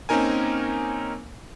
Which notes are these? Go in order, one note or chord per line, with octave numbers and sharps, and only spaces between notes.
A#3 C4 C#4 D#4 A#4 G#5